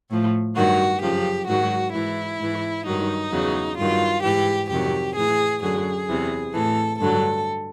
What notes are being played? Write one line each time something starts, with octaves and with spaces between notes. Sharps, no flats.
A2 F3
G2 D#3 F#3 F#4
F#2 C#3 F3 G4
G#2 D#3 F#3 F#4
G#2 E3 E4
G#2 E3
G2 D#3 F#3 D#4
E2 C#3 F#3
G2 D#3 F#3 F4
G#2 E3 G4
F2 C3 D#3 F#3 G4
A2 E3 G#4
F#2 D3 F#3 G#4
E2 C3 E3
A2 E3 A4
G2 D3 F#3 A4